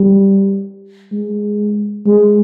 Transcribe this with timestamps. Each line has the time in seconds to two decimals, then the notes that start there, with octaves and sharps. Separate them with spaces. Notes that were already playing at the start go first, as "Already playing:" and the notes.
Already playing: G3
1.12 G#3
2.06 G#3